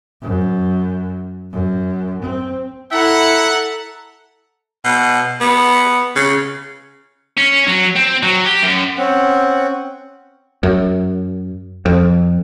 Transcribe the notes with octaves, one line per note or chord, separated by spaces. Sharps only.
F#2
F#2
C4
E4 A4 E5 F#5 A#5
B2
B3
C#3
C#4
F#3
C4
F#3
G4
F#2
C4 C#4 F#5
F#2
F2